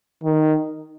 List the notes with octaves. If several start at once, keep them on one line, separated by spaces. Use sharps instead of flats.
D#3